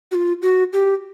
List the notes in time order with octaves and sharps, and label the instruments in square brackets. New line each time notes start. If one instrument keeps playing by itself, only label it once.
[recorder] F#4
F4
F#4
G4